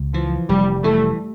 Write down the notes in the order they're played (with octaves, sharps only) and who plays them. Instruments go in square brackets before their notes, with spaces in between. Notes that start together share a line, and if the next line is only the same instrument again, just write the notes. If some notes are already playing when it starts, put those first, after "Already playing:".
Already playing: [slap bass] C#2
[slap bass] E3 [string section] F3
[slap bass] F1 [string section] G3
[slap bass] E3 [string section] A3